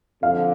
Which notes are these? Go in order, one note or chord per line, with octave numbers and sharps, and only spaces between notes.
F2 D3 F5